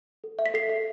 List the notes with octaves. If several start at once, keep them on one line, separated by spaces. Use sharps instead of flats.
A4
E5
B6
A4 C7
E5